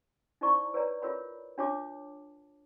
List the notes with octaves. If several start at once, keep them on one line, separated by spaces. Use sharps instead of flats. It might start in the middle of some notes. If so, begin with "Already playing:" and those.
D#4 E4 C5 D5 A#5 C#6
B4 C#5 D5 A#5
F4 A#4 C#5 B5
D4 F4 C#5 A5 D6